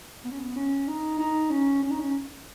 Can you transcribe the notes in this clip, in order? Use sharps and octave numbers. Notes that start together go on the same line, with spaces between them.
B3
C#4
B3
C#4
D#4
D#4
C#4
C#4
D#4
C#4